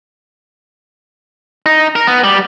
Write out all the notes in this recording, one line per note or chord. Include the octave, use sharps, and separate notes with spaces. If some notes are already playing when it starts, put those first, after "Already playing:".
D#4
A#4
B3
G3